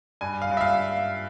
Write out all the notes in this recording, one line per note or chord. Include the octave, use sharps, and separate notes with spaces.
G2 G#5
F5
G2
E5
F5